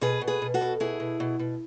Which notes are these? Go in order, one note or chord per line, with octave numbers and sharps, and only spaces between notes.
B2 G#4 B4
B2
G#4 B4
B2
F#4 A4
B2
B2 E4 G#4
B2
B2
B2